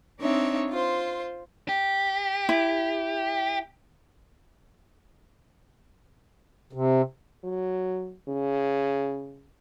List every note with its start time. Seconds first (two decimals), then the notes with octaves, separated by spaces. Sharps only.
0.19 C4 D4 D#4 C#5 E5
0.69 F4 C5
1.69 G4
2.49 E4
6.73 C3
7.44 F#3
8.28 C#3